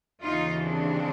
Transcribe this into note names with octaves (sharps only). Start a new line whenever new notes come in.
D#2 C#3 E3 D#4 F4
C4 D4